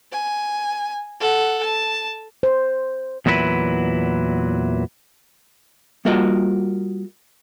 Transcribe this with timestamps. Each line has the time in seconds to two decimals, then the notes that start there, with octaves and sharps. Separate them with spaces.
0.12 G#5
1.20 A4 F#5
1.64 A5
2.43 C5
3.26 E2 A#2 F#3 E4 B4
6.05 G3 A#3 F4 F#4 A#4 D#5